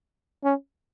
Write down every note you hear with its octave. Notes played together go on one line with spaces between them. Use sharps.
C#4